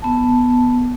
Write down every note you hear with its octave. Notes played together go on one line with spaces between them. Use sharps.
B3 A5